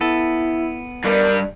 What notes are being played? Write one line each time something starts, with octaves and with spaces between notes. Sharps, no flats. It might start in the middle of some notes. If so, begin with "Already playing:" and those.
B3 E4 A4
G2 G3 D4 A#4 D#5